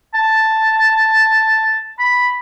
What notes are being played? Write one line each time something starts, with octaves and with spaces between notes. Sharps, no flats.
A5
B5